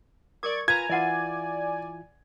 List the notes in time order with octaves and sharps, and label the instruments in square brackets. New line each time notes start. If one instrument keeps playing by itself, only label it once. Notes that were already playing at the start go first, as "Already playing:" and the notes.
[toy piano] A#4 D6 [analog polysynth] D5 C#6 G#6
[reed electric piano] F4 B4 B5 [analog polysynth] G#5 A#5 [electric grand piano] G#6
[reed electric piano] E3 E4 F4 [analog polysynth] D5 G#5 [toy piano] E5 F#5